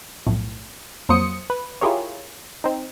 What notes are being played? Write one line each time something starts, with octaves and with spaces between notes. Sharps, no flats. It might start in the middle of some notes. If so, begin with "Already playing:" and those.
B1 F2 A2
F2 F#3 A#3 C5 D#6 C#7
B4
E4 F4 G4 G#4 A#4 C#5
C4 D#4